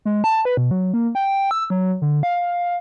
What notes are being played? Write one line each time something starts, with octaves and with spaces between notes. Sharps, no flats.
G#3
A5
B4
B2
F#3
A#3
G5
E6
F#3
D3
F5